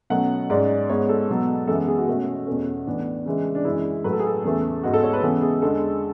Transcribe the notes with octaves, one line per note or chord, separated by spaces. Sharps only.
B2 F#3 A3 C#4 F#5
G#2 G#3 C#4 D5
G#2 G#3 B3 C#5
A4
B2 F#3 B3
F#2 E3 G#3 B3 A4
G#4
F#4
B2 A3 C#4
E2 B2 A3 C#4
A2 E3 B3 D4
C#3 E3 G#3
D4
F#2 E3 G#3 E4
A2 F#3 A3 B4
A4
G#4
A4
E2 C#3 E3 A3
G#2 G#3 B3 F#4
A4
C#5
B4
C#3 E3 B3 A4
G#4
E2 D3 G#3 A4